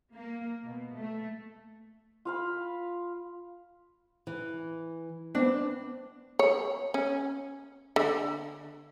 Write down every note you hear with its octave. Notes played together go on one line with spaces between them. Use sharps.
A#3
B2
A3
F4 F5 B5
E3
B3 C4 D4
C#5
C#4
D3